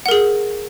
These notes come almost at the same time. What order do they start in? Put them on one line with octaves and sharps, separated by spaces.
F#5 A#4 G#4